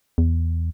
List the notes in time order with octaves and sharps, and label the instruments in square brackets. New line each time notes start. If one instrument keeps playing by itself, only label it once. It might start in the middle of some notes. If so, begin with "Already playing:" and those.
[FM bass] E2